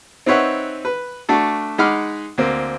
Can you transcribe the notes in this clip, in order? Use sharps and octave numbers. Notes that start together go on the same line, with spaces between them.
C4 D#4 B4 C#5 E5 F#5
B4
A3 D4 F#4 A4
G#3 D#4 F#5 B5 D6 F6
D2 A#3 C4